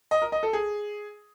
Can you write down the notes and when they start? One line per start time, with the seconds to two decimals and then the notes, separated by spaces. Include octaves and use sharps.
0.11 D#5
0.22 A#4
0.32 D#5
0.43 A4
0.53 G#4